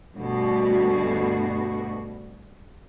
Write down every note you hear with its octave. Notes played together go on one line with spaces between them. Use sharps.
D2 G2 B2 F#4